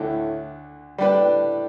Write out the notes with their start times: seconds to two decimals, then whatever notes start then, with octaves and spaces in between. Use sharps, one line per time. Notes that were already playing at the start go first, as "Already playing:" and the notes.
Already playing: D2 A2 D3
0.98 A2 G3 D4 G4 B4